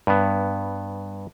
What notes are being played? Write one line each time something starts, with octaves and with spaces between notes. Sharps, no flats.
G2 B3